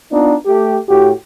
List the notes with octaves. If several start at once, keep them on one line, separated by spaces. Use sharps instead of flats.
B3 D4 D#4 F4
A3 G4
A2 F#4 G4